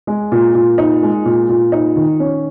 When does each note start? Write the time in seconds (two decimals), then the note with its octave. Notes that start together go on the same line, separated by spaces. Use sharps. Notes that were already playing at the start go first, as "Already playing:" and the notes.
0.07 G#3
0.32 A#2
0.55 A#2
0.78 D#4
1.03 G#3
1.25 A#2
1.49 A#2
1.72 D#4
1.96 D#3
2.20 C#4